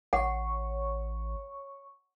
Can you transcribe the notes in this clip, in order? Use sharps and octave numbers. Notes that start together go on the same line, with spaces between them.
A1 C#5 F#5 C#6